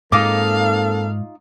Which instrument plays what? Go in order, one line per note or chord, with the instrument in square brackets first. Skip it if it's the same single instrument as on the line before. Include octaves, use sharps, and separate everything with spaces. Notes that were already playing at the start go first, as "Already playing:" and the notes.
[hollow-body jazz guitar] G#2 [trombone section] A#3 C4 A4 [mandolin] D#4 F4 D6 [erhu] F5